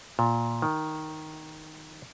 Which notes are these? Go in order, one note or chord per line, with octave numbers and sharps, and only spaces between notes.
A#2
D#3